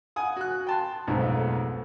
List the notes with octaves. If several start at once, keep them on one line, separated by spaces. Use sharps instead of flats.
F#5 G#5 D#6
F#4 F#6
G5 A5 C6
B1 F2 G#2 A3